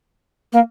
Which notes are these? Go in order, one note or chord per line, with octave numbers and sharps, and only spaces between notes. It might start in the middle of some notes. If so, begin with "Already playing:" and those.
A#3